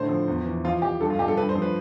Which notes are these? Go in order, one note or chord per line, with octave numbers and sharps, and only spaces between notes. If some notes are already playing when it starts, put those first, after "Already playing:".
Already playing: A2 D3 C5
F3
E2
E3
F3 F4
F3 G4
G2 A4
F4
G2 G4
A4
G2 B4
C5
F3
B4